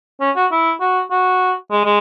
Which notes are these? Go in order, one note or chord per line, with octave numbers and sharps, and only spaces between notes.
C#4
F#4
E4
F#4
F#4
G#3
G#3